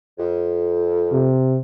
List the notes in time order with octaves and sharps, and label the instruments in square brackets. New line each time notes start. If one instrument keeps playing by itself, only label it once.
[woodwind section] F2
[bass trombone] C3